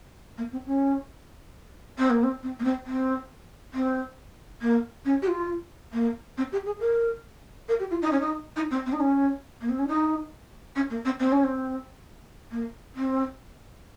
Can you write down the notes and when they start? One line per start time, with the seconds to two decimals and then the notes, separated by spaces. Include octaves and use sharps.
0.37 A#3
0.52 C4
0.66 C#4
1.98 C4
2.10 A#3
2.23 C4
2.43 C4
2.59 A#3
2.64 C4
2.86 C4
3.74 C4
4.61 A#3
5.05 C#4
5.22 G4
5.27 F4
5.93 A#3
6.37 C4
6.52 G4
6.66 G#4
6.80 A#4
7.68 A#4
7.79 G4
7.91 F4
8.01 D#4
8.11 C#4
8.20 D#4
8.56 D#4
8.70 C4
8.86 C4
8.93 D#4
9.00 C#4
9.61 A#3
9.69 C4
9.79 C#4
9.88 D#4
10.75 C#4
10.90 A#3
11.05 C4
11.19 C4
11.32 C#4
11.44 C4
12.51 A#3
12.95 C4